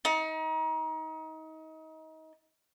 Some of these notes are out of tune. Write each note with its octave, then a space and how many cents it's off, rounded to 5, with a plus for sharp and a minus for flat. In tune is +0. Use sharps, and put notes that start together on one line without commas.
D#4 +30